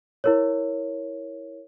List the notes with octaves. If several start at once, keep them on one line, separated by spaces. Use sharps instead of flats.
E4 A#4 C#5